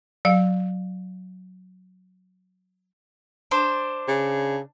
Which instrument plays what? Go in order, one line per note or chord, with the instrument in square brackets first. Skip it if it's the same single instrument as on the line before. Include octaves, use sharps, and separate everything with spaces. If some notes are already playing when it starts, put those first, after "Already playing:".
[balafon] F#3 F5
[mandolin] D4 C5
[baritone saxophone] C#3